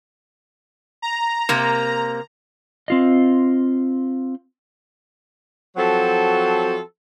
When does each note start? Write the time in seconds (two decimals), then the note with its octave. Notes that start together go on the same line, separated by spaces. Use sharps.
1.02 A#5
1.49 C3 A#3
2.88 C4 F4 D#5
5.77 F3 F#3 C4 F#4 A4